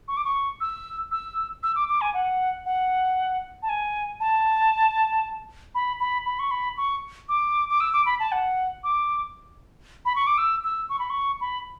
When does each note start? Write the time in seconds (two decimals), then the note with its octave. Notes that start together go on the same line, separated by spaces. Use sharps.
0.08 C#6
0.17 D6
0.25 C#6
0.61 E6
1.11 E6
1.63 E6
1.76 D6
1.89 D6
2.01 G#5
2.14 F#5
2.66 F#5
3.63 A5
3.69 G#5
4.20 A5
5.75 B5
6.00 B5
6.26 B5
6.39 C#6
6.51 B5
6.77 C#6
7.29 D6
7.70 D6
7.81 E6
7.93 D6
8.06 B5
8.20 A5
8.32 F#5
8.84 D6
10.05 B5
10.16 C#6
10.27 D6
10.38 E6
10.64 E6
10.90 C#6
10.99 B5
11.10 C#6
11.41 B5